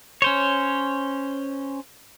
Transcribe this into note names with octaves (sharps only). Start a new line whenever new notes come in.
C#4 C5 C#5